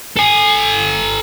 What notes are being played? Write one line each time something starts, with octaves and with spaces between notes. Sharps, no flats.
A4 G#5